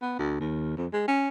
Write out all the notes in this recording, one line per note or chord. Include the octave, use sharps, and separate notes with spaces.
B3
D2
D#2
F2
G#3
C#4